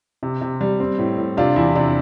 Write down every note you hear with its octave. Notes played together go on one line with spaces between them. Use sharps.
C3
C3
G3
C4
A2
A2
C3 D4 F4
E2 E4
C3 D4